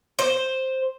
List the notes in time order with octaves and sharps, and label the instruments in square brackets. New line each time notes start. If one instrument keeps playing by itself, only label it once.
[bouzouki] C5